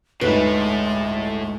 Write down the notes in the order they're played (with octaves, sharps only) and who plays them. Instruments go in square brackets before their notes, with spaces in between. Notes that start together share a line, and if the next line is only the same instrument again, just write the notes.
[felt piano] G1 D2 D#4 [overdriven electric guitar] A2 A3 [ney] G#3 [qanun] B4